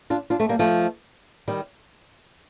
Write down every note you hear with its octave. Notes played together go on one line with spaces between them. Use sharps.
D4 F4
D4 F4
A3 C4
G3 A#3
F3 A3
D#3 G3